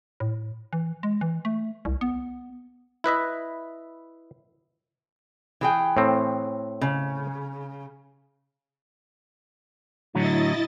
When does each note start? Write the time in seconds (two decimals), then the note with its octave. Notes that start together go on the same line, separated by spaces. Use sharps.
0.20 A2
0.73 E3
1.03 G#3
1.21 E3
1.45 A3
1.85 C2
2.01 B3
3.04 E4 B4 D#5 E5
5.61 E3 G#4 G5
5.97 A2 C4
6.81 C#3
10.15 A2 D3 F#3 E4 D#5 A6